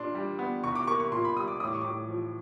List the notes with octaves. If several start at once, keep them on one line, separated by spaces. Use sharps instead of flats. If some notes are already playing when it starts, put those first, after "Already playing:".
Already playing: A#2 D4 C6
G3
B3
C2 C#6
D6
A#3 C#6
C#6
A#2 C6
B5
G3 D#6
D6
A2 D#6
D6
C#6
A2 D6
F3